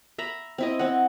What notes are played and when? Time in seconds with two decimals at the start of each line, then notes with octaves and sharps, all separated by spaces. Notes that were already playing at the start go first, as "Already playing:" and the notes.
0.18 E5 A#5 B5
0.58 C4 E4 D#5
0.79 C4 F#5